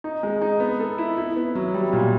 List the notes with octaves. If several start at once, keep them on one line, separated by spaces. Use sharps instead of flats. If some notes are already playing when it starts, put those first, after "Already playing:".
D#4
G#3
D#4
B3
A4
E4
E4
B3
F#3
G3
A#2